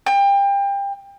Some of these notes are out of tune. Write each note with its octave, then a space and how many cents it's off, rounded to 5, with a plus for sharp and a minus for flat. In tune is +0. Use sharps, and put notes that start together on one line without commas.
G5 +30